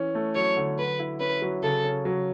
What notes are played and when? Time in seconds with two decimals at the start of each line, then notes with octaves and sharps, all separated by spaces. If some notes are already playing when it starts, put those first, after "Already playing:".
Already playing: E3 C#4
0.15 A3
0.35 F#3 C#5
0.57 D3
0.78 F#3 B4
0.99 E4
1.20 C#4 B4
1.42 F#3
1.63 C#3 A4
1.84 C#4
2.05 F#3